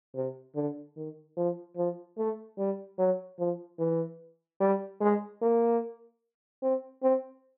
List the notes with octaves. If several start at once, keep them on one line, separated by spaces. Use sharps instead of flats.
C3
D3
D#3
F3
F3
A3
G3
F#3
F3
E3
G3
G#3
A#3
C4
C4